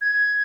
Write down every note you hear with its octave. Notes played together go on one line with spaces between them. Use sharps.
G#6